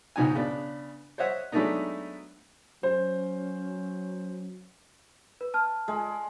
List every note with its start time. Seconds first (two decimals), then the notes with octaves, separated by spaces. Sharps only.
0.16 C#2 G#2 B2 D#4 G#5
0.35 C#3 B3 D4
1.18 C5 C#5 D#5 E5 F#5
1.52 F#3 G#3 A3 B3 D4 D#4
2.83 F#3 C#4 C5
5.41 B4
5.54 A5 F6
5.88 G#3